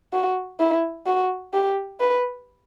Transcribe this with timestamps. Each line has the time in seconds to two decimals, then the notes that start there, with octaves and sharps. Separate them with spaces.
0.13 F#4
0.60 E4
1.06 F#4
1.53 G4
2.00 B4